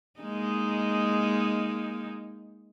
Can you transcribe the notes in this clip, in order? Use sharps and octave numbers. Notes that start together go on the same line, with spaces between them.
G#3 A#3 D#4